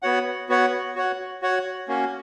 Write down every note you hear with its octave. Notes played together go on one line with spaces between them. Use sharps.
B3 F#4 C#5 F#5
B3 F#4 C#5 F#5
F#4 C#5 F#5
F#4 C#5 F#5
A#3 C#4 F#4